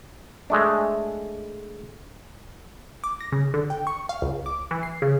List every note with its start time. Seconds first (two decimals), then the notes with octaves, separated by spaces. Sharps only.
0.50 G#3 A3 D4
3.04 D6
3.21 A#6
3.32 C#3
3.54 D3
3.70 G5
3.87 C#6
4.09 F5
4.22 C#2
4.46 D6
4.71 E3
4.83 C7
5.02 C#3